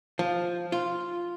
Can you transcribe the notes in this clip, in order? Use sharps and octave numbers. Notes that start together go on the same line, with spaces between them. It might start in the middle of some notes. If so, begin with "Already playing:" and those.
F3
F4